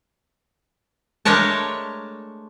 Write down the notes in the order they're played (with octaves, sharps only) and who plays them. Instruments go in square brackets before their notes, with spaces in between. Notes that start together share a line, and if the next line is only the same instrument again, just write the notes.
[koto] G#3 A3 D4 A#4 C#5 A5